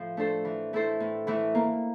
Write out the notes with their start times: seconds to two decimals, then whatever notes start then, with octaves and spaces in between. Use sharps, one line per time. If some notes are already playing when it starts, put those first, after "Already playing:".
Already playing: A2 F3
0.17 A3 D4 A4 C5
0.45 E3
0.73 A3 E4 A4 C5
1.00 A2
1.27 E3 A3 E4
1.55 A#3